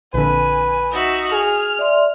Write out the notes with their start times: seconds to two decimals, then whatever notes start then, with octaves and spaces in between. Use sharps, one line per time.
0.14 A#1 D3 B4 G#5
0.91 D#4 F#4 E5
1.32 G#4 F6
1.79 D5 E5 C6